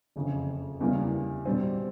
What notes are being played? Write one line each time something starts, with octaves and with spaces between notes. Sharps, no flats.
F#1 F2 C#3
E2 C#3 E3 G3 A#3
B2 G3 C4